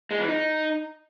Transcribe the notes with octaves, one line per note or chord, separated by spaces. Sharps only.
G#3
E3
D#4